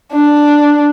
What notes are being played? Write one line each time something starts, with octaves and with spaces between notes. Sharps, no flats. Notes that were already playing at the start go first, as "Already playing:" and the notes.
D4